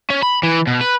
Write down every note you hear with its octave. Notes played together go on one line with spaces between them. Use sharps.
C#4
B5
E3
B2
B4